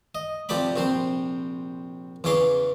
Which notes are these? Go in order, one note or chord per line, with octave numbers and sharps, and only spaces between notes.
D#5
C3 F3 G4 A4 D5 B5
A#1 C3 C4 C5
E2 C#3 E3 C#5 C6 D6